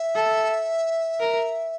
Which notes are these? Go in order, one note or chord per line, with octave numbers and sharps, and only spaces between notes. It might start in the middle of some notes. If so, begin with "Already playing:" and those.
Already playing: E5
A4
A#4